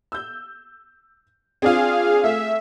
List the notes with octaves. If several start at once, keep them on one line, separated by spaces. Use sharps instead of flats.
E6 G6
C4 D4 F4 G#4 F5
A3 E5